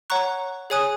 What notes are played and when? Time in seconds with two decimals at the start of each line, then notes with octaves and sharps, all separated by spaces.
0.10 C#5 F#5 A#5 C#6 F#6
0.70 G#4 C#5 G#5 D#6 F#6